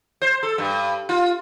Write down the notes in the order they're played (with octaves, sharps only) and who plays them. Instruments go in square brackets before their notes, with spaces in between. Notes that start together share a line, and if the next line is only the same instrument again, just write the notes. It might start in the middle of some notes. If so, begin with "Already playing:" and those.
[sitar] C5
A4
G2
F4